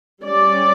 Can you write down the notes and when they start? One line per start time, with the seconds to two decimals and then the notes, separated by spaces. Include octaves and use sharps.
0.24 G3 C#4 D5